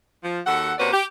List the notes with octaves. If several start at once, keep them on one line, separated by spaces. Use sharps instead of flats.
F3
D#2 F#4 A4 F#5
C3 A#3 C#4 F#4 B4 D5
G4